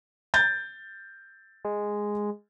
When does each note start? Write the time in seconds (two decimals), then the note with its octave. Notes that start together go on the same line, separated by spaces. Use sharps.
0.34 G6 A6
1.65 G#3